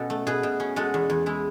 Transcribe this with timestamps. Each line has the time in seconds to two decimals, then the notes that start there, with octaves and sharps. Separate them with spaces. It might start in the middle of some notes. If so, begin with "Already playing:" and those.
Already playing: B2 C#4 F#4 A4
0.10 A3
0.27 B2 G#4 B4
0.43 B2
0.60 C#4
0.76 G#3 F#4 A4
0.94 E2
1.10 E2
1.26 G#3 E4